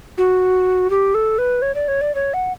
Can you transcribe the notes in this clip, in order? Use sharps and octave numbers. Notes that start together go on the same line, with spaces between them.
F#4
G4
A4
B4
C#5
D5
C#5
D5
C#5
F#5